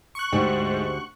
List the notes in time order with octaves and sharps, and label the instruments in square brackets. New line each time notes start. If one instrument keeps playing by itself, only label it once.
[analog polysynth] C#6 F#6
[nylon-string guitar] D2 G4 F#5 [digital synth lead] G#2 [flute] C5